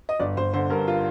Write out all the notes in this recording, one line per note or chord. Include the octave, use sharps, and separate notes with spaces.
D#5
G1 D5
G1 C5
D3 C5
G2 A#4
F4